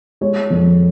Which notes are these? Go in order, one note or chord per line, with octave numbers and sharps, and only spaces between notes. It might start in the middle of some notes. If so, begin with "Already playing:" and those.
G#3 C#5
F2